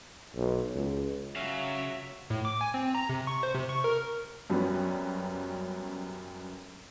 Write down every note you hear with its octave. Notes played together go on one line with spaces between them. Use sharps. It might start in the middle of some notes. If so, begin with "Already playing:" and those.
B1
C#2
C#3 F#4 C#5 E5 F5
A2
D6
G#5
C4
A#5
C3
C#6
C5
C3
C#6
A#4
F#2 F#3 G3 B3 C#4